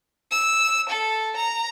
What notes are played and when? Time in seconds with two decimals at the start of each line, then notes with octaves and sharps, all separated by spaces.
0.31 E6
0.90 A4
1.37 A#5